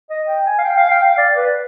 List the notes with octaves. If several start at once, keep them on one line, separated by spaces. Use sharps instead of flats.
D#5
G5
G#5
F5
G5
F5
G5
F5
D5
B4